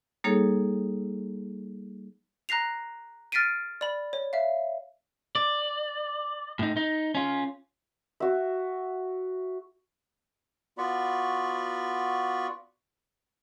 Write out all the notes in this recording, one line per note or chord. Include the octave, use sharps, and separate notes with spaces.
G3 A#3 D#4 G#4 A4 C#5
A#5 F#6 A#6 C7 F7
F6 A6 B6 C7 D7 D#7
D5 B5
C#5
E5 F5
D5
A2 D#4
D#4
C#4 F4
F#4 E5
B3 F4 F#4 D5 B5 C#6